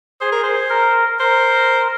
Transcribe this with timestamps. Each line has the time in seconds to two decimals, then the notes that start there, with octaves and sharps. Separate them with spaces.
0.21 G#4 C5
0.32 A#4
0.43 C5
0.70 A#4
1.19 A#4 C5